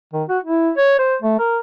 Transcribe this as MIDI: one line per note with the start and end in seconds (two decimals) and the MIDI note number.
0.13 0.23 51
0.29 0.38 66
0.43 0.71 64
0.77 0.97 73
0.99 1.16 72
1.22 1.36 57
1.39 1.59 70